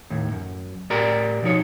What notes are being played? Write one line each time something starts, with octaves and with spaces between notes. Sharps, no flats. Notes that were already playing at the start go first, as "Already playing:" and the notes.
D#2 A2
F#2
A2 G4 A#4 D5 A#5
B2 F3 D#4 C#5